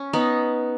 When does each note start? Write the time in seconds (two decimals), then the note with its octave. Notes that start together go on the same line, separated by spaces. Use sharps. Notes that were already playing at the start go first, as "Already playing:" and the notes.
Already playing: C#4
0.13 B3 D#4